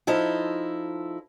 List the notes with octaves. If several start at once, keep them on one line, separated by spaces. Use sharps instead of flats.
F3 D#4 E4 A4